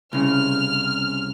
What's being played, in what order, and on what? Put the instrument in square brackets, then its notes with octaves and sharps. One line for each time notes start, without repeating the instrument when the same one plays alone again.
[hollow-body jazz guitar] C2 C#3 [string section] F6